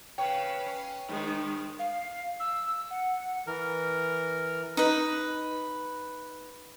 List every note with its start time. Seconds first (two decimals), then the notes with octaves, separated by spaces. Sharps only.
0.18 C#3 B4 C#5 F5 G5
0.66 C#4
1.09 G2 D#3 G#3
1.79 F5
2.40 E6
2.91 F#5
3.47 E3 A#4
4.77 D#4 B4